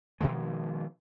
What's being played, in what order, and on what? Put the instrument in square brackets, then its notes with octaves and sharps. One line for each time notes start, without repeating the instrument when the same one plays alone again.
[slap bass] B2 D#3 F3 G#3